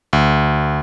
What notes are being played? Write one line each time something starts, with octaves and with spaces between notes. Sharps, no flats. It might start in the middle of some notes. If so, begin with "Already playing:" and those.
D2